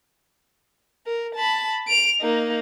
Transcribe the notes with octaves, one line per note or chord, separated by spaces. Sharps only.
A#4
A5 B5
D7 F7
A#3 D#4